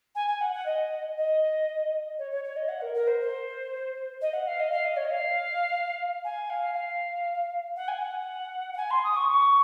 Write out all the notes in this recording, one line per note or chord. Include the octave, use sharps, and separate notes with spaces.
G#5
G#5
F#5
F#5
D#5
D#5
C#5
C#5
C#5
D#5
F#5
A#4
A#4
C5
C5
D#5
F#5
F5
D#5
F5
D#5
C#5
D#5
F5
G#5
F5
F5
F#5
G#5
F#5
F#5
G#5
C6
D#6
C#6
C#6